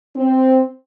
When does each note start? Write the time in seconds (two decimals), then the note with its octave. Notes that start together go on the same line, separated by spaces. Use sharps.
0.16 C4